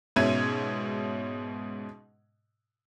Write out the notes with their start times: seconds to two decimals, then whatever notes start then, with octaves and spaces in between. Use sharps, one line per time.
0.16 G#2 B2 C#4 E5 G#6 D#7